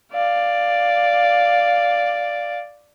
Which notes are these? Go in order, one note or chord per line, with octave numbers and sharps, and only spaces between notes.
D5 F5